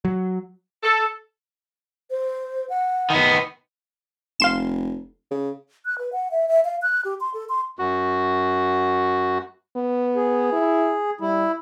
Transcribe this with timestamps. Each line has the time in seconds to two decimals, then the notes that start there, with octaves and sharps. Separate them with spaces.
0.05 F#3
0.83 A4
2.11 C5
2.70 F#5
3.10 D#3 B3
4.40 F1 F5 C6 E7
5.31 C#3
5.86 F#6
5.98 B4
6.13 F#5
6.31 E5
6.48 E5
6.65 F5
6.82 F#6
7.05 G4
7.21 C6
7.34 A4
7.49 C6
7.79 F#2 F#4
9.76 B3
10.16 G#4
10.52 E4
11.21 G3 E4